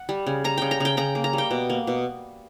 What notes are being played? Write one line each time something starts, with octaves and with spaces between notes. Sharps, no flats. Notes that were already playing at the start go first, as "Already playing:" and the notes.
Already playing: F#5
G3
C#3
G3 A#5
C#3 G5
A#5
C#3 G5
C#3 A#5
A#3
A#5
G3
G5
B2
A#3
B2